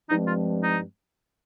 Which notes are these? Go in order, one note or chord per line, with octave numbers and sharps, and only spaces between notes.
G2 F3 G#3 C4 D#4
F4
D#4